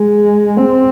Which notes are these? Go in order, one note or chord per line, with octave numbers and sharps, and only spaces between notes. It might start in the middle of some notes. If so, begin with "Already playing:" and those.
Already playing: G#3
C4